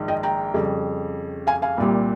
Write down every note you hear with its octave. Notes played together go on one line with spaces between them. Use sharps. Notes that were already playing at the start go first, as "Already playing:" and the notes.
Already playing: A#1 G#2 D#3 G#3
D#5 G5
G5 A#5
F2 C#3 G3
F5 G#5
F5 G#5
C2 A#2 G3